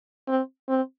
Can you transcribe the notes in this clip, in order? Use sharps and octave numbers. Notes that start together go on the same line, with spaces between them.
C4
C4